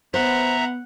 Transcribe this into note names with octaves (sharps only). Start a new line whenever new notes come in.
B3 C5 E5 F#5 A#5